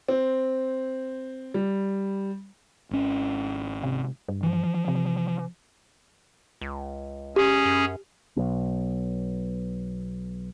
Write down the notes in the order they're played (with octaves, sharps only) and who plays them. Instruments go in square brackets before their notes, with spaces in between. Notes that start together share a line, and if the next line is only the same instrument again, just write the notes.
[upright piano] C4
G3
[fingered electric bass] G#1 C#4
[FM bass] C3
G2
[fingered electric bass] E3 F3
[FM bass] C3
[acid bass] C#2
[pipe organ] C#4 G#4 [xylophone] G4
[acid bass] F#2
[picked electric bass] B1 B2